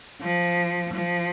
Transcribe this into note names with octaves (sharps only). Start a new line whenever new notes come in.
F3
F3